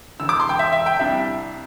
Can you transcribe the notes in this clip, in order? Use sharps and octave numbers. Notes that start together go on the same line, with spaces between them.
E1 E2 D3 E6
D6
C6
G5
E5
E5
G5
C2 C3 G3 D4 E5